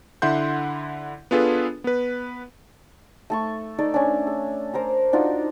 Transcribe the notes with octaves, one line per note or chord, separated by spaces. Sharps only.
D3 E4 E5 F#5 C6 G6
B3 D4 F4 G#4 A4 B4
B3 B4
A3 A4 C#6
D#4 A4 D5
C#4 D4
A4
A#4 C5 A#5
D4 D#4 F4 F#4